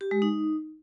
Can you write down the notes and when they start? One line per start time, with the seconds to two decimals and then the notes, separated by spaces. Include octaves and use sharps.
0.01 G4
0.11 G#3
0.22 D#4